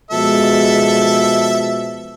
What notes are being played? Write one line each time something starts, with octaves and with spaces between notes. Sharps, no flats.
B2 F3 G#3 A4 E5